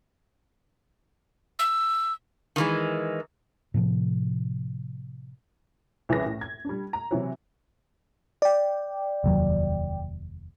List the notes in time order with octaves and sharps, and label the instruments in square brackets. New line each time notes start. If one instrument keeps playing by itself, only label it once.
[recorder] E6
[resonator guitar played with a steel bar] D#3 E3 G#3
[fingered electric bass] A2 C3 F3
[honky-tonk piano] C2 E3 C#4 G#4 B4 A#6
A2
G#6
G3 D4
A#5
C3 E3 F#3
[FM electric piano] D5 G5
[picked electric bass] F1 D#2 F#3